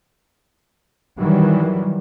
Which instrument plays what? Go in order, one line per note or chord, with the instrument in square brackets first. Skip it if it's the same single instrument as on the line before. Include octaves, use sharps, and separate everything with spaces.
[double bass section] D#3 E3 F#3 G3